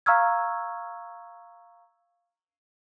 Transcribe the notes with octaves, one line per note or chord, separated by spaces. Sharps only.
F5 A#5 C#6 E6 F6 G#6